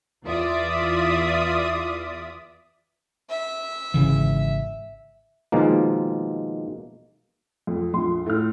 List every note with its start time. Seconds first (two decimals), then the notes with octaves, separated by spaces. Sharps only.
0.25 E2 F4 D5 E5 D#6
3.30 E5
3.94 G#1 C#3 E3
5.52 B2 D#3 F3 G#3 A#3
7.67 F2
7.93 A#1 F2 C6
8.26 A2 F6